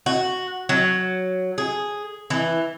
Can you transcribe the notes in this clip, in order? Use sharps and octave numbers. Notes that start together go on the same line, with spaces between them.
F#4
F#3
G#4
E3